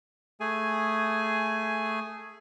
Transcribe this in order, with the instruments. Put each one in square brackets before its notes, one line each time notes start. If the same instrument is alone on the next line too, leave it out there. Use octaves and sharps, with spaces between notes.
[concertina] A3 G#4 G#5